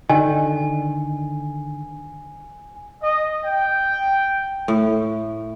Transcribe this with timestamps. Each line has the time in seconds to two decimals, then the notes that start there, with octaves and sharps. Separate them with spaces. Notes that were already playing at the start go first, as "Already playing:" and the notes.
0.10 D3 D#3 G#5
3.02 D#5
3.45 G5
4.68 A2